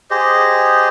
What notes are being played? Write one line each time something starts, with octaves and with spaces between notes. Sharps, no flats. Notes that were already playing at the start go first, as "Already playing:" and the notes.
G4 G#4 C5 D#5